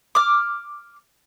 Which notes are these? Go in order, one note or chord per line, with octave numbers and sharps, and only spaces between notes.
D6 F6